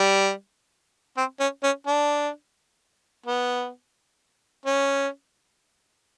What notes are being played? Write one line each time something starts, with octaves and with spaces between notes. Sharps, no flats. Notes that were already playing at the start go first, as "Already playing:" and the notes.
Already playing: G3
C4
C#4
C#4
D4
B3
C#4